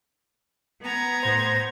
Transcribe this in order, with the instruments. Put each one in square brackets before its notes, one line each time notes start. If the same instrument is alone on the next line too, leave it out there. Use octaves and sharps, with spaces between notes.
[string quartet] B3 A#5 G#6
[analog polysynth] A2 C5 [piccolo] A#6